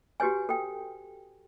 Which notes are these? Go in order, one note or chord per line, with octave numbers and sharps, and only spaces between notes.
F#4 G4 B4 C#5 G#5
A4 G5